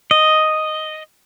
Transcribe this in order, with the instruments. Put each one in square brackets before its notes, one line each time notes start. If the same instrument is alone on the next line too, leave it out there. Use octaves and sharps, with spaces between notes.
[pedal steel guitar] D#5